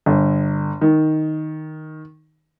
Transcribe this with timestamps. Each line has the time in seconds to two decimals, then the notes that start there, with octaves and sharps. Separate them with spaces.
0.06 G1
0.81 D#3